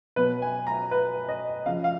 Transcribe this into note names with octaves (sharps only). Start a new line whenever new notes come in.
B2 F#3 B4
G#5
A#5
B4
D#5
C#3 F3 F5
F5